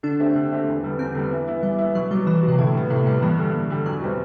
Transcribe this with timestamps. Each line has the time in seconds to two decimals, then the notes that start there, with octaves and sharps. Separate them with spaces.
0.03 D3 D4
0.20 A3 C4 G4
0.35 D3
0.52 A3 C4 G4
0.68 E2
0.84 D3 G3 B3
0.99 E2 C4
1.15 D3 G3 B3
1.31 E3
1.47 B3 E4
1.62 E3 G3
1.79 B3 E4
1.95 B2 F#3
2.11 F#3 G3 B3
2.26 B2 E3
2.43 F#3 B3
2.48 C3
2.58 A2 D3
2.74 G3 B3
2.90 A2 C3
3.06 C3 G3 B3
3.22 G2 E3
3.39 D3 G3
3.54 G2
3.70 D3 G3
3.86 E2 F#3
4.01 B2 G3 C4